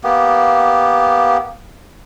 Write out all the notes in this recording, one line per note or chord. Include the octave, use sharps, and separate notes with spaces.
A#3 B3 G4